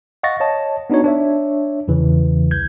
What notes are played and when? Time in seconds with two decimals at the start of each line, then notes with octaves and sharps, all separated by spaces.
0.23 D#5 F5 F#5 C#6 A6 A#6
0.40 C#5 D#5 A5
0.90 B3 D4 D#4 F#4 C#5
1.04 D4 C#5 E5
1.88 E2 C#3 E3
2.51 C2 G6 G#6